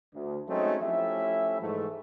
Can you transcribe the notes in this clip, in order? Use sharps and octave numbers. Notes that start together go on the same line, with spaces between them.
D2
F#3 G#3 A3 C4 C#4 D#4
F3 A3 C#4 E4 G4 E5
G#2 E3 A3